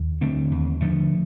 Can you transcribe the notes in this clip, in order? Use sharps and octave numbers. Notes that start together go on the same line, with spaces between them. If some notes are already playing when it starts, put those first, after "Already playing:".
Already playing: D#2
D3 A3 C4
D#2
D3 F3 A3